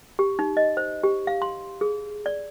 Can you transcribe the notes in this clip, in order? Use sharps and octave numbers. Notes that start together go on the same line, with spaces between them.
G4
D#4
D#5
C5
G4
F5
C6
G#4
D5